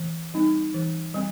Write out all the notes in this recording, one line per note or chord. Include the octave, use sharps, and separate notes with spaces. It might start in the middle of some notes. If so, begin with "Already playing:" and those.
Already playing: E3
G3 C4 D#4
E3
G3 C4